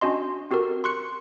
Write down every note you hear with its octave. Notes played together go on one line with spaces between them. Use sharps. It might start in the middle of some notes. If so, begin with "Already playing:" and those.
C#4 D4 F#4 D#5 C6
C4 F#4 G4 A4 A#4
C6 C#6 F#6 C#7